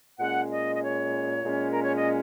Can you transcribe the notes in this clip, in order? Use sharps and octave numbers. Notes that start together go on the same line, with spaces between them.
A#2 G#3 C#4 F#5
D#5
D#5
C#5
A#2 G#3 C#4
A#4
C#5
D#5